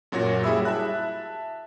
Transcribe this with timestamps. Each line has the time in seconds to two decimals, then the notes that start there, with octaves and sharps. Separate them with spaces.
0.12 F#2 A#2 F#4 C#5 A#6
0.43 G3 E4 G#4 E5 B5 E6
0.65 E5 A5 F#6